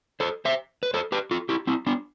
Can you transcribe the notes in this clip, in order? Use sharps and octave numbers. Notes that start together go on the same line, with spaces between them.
A4 C5
C5 E5
B4
A4 C5
G4 B4
F4 A4
E4 G4
C4 E4
B3 D4